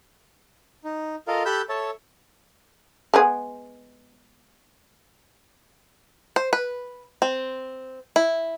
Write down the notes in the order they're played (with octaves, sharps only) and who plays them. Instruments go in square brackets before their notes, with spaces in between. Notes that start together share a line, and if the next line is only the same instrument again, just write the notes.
[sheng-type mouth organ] D#4
F4 A4 A#4 D#5 F5
G4 A4 B5 E6 F#6 G6
A4 C#5 E5 A5
[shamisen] G#3 B3 G#4
[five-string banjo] C5
B4
C4
E4